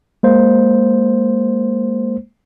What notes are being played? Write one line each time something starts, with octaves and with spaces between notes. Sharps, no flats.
G#3 A#3 C5